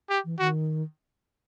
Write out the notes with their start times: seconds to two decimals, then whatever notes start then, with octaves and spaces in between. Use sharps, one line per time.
0.10 G4
0.25 E3
0.39 D#3 F#4